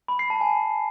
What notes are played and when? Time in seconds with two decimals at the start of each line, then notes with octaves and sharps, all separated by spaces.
0.08 B5
0.19 C7
0.30 A5
0.41 G#5